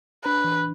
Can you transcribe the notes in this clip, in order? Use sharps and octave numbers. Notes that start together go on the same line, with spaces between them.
D4 B4
E3